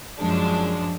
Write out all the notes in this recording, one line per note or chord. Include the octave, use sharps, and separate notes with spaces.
F#2 F3 G#3 D4